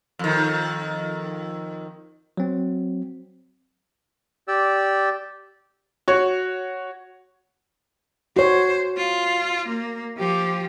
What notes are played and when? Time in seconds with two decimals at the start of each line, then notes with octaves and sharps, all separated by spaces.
0.19 F2 D#3
2.37 F#3 C4
4.48 G4 D5 E6
6.08 F#4 C#5
8.36 F#4 C5 C#5
8.97 F4
9.68 A#3
10.17 F3 G4